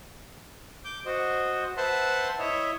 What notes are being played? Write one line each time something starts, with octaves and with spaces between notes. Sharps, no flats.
D6 G6
F#4 C5 D#5
B4 C5 E5 F#5 A5 C6
E4 C#5 D#5 E5